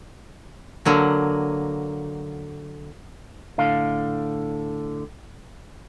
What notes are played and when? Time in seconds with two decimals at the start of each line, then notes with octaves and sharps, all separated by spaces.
0.85 D3 F#3 A#3
3.58 A2 D3 F5